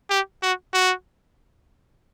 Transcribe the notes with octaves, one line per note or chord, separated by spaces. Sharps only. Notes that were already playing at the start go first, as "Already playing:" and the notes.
G4
F#4
F#4